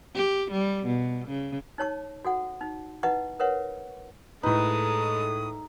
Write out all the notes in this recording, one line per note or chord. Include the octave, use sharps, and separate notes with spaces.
G4
G3
B2
C#3
D#4 C#5 A5 C#6
F#4 A4 F#5
D#4
D#4 E4 B4 D#5 F#5 C#6
A#4 B4 C#5 E5 F#5
A2 G#3 D#4 A4 B4 D#6